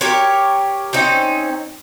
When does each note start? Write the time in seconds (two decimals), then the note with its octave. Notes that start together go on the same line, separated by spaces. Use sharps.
0.01 G4 A#4 C#5
0.93 C4 C#4 D#4